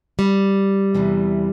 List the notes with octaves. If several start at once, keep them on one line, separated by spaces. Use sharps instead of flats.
G3
E2 C3 E3